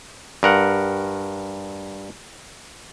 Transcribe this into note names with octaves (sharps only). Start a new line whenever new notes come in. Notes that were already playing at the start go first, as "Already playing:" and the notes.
G2 A#4 F#5